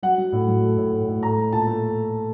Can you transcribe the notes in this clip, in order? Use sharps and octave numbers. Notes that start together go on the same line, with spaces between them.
F#3 F#5
F#3
A2
F#3
A3
A2
A2
A2
A3 A#5
A3
A#2 A5
A3